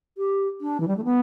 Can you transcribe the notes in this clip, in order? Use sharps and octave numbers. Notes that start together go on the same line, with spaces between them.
G4
D4
E3
G3
A3
B3